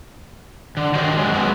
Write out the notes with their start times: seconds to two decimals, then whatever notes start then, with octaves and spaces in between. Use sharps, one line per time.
0.77 D3
0.95 D#3 F#4 G4 C5 C#5 D#5
1.18 F#2 C3 F#3 G#3
1.34 F#3 G#3 B3 C4